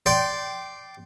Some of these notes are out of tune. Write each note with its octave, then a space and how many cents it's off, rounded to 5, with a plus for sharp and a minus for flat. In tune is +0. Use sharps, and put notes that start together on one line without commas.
D5 +0 G5 -20 C6 +0